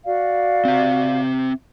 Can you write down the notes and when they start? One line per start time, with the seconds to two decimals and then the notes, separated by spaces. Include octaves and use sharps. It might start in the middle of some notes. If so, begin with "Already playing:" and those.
0.05 F#4 D5 F5
0.65 C4 E5